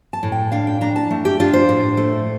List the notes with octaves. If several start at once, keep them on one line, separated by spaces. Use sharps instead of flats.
A5
A2
G5
D4 F5
G5
D4 A#5
A5
A3
G4
D4 F4
C5
A2
A3